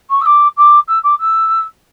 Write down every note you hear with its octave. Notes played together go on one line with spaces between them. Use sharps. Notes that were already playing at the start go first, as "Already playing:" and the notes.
C#6
E6
D6
D6
E6
D6
E6